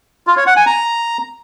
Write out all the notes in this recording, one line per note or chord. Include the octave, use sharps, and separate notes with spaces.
F4
C#5
F#5
G#5
A#5